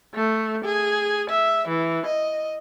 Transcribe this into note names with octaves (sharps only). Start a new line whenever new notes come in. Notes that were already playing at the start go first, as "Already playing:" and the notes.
A3
G#4
E5
E3
D#5